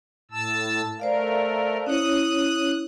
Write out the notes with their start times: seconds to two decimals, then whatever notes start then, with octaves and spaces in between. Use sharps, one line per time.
0.31 A2 A5 E6
1.00 A3 A#4 C5 D5 F5
1.87 C#4 E4 C#5 D#6 F#6